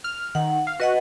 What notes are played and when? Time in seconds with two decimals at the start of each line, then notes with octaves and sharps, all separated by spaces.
0.04 F6
0.35 D#3 F#5
0.67 F5
0.80 F#4 B4 D#5 F#5